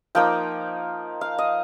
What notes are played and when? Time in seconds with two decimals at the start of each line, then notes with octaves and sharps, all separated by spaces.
0.15 F3 A#3 D#4 G5
1.21 F5
1.38 D#5